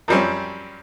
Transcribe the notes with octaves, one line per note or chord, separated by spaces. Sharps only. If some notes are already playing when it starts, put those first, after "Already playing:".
F#2 F3 G3 C4 C#4